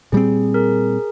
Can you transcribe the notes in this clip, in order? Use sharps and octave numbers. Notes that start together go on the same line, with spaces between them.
A#2 G3 C4 G#4
G#4 A#4